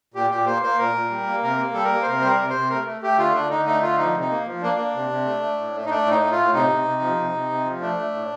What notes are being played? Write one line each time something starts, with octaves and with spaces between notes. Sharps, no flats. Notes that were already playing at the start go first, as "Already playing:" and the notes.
A#2 G4
A#2 G4
A#3 C5
A#3 C5
A#2 A#4
A#2
G3
A#3
C3 A#4
A#3
G3 A4
A#4
A#3
C5
C3 A#4
G3 C5
A#4
C3
C5
C3
A3 A#4
A3
A3 G4
D3 F4
D3 D4
D3 D#4
A3 D#4
D3 F4
F3 D#4
C3
D#4
A#3
F3
A#3 D4
A#3
C3
C3
A3
A3
A2
A3
D#4
A3 D4
A2 D#4
A3
F4
A2
C3 D#4
C3
C3
F3
C3
C3
C3
F3
A3 D4
A3
A2